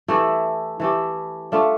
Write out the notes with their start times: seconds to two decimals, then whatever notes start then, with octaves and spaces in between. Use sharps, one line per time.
0.08 E3 A3 E4 G4
0.80 E3 A3 E4 G4
1.52 A3 D4 F4